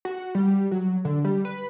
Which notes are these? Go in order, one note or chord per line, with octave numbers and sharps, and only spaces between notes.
F#4
G3
F#3
D3
G3
B4